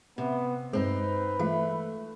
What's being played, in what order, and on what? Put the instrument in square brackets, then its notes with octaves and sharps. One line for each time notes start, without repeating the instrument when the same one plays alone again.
[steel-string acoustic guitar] C3 [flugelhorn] B3
[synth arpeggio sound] G2 G#3 [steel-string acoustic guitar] C4 D4 D#4 [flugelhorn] B4
[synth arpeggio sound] E3 G#3 F4 [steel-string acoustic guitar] A3